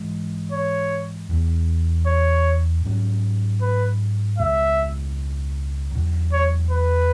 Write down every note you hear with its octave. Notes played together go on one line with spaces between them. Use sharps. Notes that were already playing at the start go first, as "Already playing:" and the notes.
Already playing: G#2 E3 G#3
C#5
E2 E3 B3
C#5
G#2 F#3 C#4
B4
C#2 B2 G#3 E5
E2 B2 F#3
C#5
B4